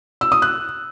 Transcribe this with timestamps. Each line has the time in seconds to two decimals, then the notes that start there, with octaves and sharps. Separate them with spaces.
0.21 E6
0.32 D#6
0.42 F#6